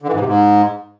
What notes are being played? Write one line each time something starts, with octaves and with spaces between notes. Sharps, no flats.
D3
E3
G#2
C3
G#2